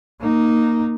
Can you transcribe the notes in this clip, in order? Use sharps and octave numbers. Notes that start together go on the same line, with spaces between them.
A#3 D#4